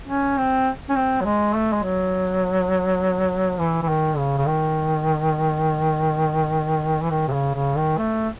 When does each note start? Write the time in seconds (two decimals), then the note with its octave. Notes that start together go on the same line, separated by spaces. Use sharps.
0.08 C#4
0.38 C4
0.90 C#4
0.96 C4
1.21 F#3
1.25 G#3
1.54 A3
1.73 G#3
1.84 F#3
3.59 E3
3.82 E3
3.88 D#3
4.17 C#3
4.37 C#3
4.47 D#3
7.03 E3
7.10 D#3
7.28 C3
7.32 C#3
7.55 C#3
7.77 D#3
7.98 A3